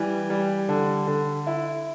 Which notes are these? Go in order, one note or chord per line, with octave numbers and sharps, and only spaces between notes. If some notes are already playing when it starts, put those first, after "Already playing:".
Already playing: E3 G3
G3
D3
D3
E4